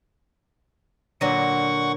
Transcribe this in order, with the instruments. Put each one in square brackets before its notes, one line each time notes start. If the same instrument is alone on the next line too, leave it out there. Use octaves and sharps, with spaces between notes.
[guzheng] A#2 D3 F#3 [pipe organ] F#5 C#6